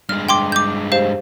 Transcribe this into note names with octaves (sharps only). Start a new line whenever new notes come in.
G2 G#3 F6
G5 C6 D6
D6 G6
G4 C5 F5